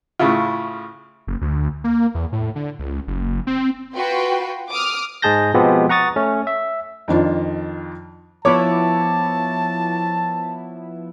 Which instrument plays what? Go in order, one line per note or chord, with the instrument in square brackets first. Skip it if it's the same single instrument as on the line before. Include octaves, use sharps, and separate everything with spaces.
[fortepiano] A2 C#3 E4 F4
[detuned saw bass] F#1
D2
A#3
E2
A2
D3
C#2
F#1
C4
[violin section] F4 F#4 B4 G5 C6
D6 D#6 F6
[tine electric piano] G#2 G#3 G#4 A5 G6 A#6
B2 F3 G#3 B3 C4 G4
F#5 A#5 C#6 D#6 A6
A3 C#4
E5
[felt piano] F2 D#3 D4 F4
[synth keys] F3 B3 E4 [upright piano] C#5 D6 [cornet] A5